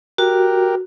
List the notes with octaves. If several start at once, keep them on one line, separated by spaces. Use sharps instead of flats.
F#4 G4 A#4